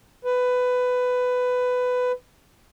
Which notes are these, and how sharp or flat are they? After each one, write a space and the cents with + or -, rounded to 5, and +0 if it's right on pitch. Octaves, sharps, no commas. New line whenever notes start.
B4 +15